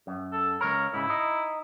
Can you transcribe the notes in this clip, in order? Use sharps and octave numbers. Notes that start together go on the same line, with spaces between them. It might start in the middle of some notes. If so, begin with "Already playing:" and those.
F#2
A4
C#2 A#4 C#5
G#2 C#3 E4
D#4